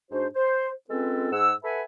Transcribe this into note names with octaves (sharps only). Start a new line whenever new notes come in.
G#2 D4 F#4 C5
C5
G#3 C4 C#4 F4 A4 B4
G#2 G#4 F#5 E6
A4 B4 E5 F#5 G#5 B5